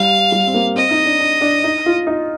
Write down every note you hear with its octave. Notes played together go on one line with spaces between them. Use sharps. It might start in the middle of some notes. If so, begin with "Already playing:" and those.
Already playing: G3 F5
G3
C4
A#3
C4 D#5
D#4
D4
D4
D4
D#4
F4
D#4